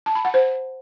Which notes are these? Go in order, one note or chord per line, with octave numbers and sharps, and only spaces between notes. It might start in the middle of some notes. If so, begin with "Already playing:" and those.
A5
B5
F#5
C5